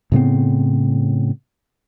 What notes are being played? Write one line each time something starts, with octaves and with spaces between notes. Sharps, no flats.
A2 C#3 B3 C4